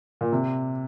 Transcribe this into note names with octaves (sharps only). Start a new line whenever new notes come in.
A#2
C3